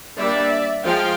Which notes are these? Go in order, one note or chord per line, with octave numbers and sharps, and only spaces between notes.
G3 A#3 D4 D5 E5
F3 G#3 F5 G5